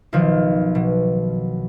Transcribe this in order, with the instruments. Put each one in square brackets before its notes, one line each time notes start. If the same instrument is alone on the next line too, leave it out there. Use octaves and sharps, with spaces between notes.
[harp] B1 D#3 F3
B2